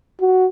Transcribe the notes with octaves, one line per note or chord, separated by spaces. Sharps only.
F#4